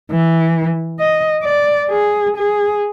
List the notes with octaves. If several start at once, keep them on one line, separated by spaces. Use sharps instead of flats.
E3
D#5
D5
G#4
G#4